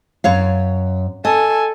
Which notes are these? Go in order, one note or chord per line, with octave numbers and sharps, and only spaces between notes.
F#2 C#5 F5
A4 D#5 G#5